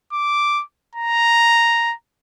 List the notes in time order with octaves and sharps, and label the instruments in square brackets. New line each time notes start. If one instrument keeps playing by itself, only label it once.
[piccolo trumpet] D6
A#5